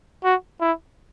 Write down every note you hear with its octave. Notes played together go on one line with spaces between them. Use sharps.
F#4
E4